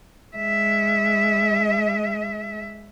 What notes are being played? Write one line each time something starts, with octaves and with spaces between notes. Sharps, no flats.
G#3 E5